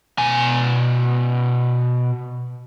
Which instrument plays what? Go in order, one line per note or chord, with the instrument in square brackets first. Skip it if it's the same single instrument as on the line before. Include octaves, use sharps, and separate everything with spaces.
[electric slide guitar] B2 G#5